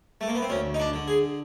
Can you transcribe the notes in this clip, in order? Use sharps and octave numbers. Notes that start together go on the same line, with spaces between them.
A3
A#3
B3
C4
D2 C#4
D#4
D4
D3
G#4